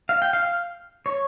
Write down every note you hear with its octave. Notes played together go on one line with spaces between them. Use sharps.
F5
G5
F5
F5
C#5